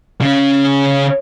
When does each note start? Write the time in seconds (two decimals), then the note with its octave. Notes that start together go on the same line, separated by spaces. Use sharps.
0.21 C#3 C#4